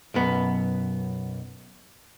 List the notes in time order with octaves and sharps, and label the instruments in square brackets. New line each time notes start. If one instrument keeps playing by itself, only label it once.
[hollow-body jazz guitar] B1 F#2 B3